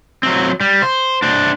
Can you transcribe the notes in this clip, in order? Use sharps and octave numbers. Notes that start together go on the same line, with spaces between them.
F#3 C4
G3
C5
D4 C5